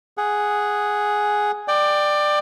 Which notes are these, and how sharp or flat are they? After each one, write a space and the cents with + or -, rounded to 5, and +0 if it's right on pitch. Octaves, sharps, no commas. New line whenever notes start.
G#4 +0 F#5 +0
D5 +20 G5 +0